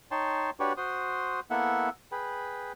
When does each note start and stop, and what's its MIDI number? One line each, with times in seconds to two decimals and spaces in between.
0.11 0.50 63
0.11 0.50 73
0.11 0.50 79
0.11 0.50 81
0.11 0.50 84
0.60 0.73 62
0.60 0.73 66
0.60 0.73 67
0.60 0.73 71
0.60 0.73 73
0.60 0.73 74
0.77 1.40 66
0.77 1.40 72
0.77 1.40 84
0.77 1.40 87
1.51 1.89 58
1.51 1.89 59
1.51 1.89 64
1.51 1.89 69
1.51 1.89 76
1.51 1.89 78
2.12 2.72 68
2.12 2.72 71
2.12 2.72 79
2.12 2.72 83